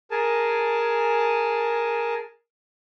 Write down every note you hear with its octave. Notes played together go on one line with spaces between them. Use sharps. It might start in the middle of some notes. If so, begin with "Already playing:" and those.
G#4 A#4 G#5 A5